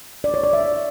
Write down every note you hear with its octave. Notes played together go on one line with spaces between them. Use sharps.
D5
C#5
D5
E5